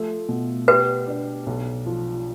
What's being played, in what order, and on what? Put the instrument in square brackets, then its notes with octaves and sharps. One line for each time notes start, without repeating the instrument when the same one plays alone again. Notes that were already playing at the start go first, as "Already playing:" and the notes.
Already playing: [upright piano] F3 A3
B2
[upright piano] G4 [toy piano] B4
[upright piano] D4
B1
F3